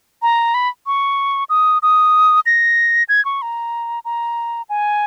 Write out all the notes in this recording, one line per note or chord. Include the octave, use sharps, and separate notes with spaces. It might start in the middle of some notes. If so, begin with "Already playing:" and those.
A#5
B5
C#6
D#6
D#6
A#6
G#6
C#6
A#5
A#5
G#5